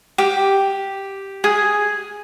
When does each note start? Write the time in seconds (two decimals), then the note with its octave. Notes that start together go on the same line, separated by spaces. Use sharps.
0.18 G4
1.44 G#4